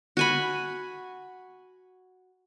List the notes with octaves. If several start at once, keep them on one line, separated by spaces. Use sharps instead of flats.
F#4 G#5 B5